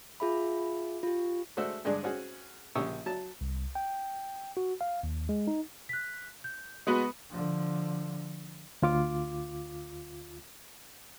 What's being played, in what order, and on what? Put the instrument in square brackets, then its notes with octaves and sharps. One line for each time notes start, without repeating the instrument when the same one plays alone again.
[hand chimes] F4 G#4 E5 B5
F4 G4
[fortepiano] G#3 A3 D4 F#4 C5 E5
G2 G#3 D4 G#4
C4 C#4 F#4 G#4
A#1 C#3 G4 C#6 D#6 E6
F#3 A5
[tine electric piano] C2
G5
F#4
F5
D#2
G#3
D#4
[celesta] F#6 B6
G6
[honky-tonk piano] G#3 B3 F#4 [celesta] B5 D#6
[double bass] D3 F3
[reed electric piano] D2 F4 D6